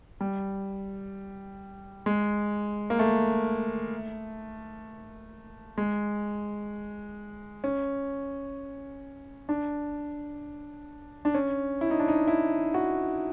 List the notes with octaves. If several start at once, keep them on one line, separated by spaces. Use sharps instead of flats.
G3
G#3
A#3
A3
G#3
C#4
D4
D4
C#4
E4
D#4
D4
D#4
E4
F#4